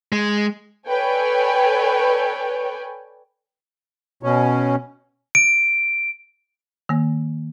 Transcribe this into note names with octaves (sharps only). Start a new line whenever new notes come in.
G#3
A4 B4 C#5 D5 G5 G#5
B2 C#4
D7
D#3 A#3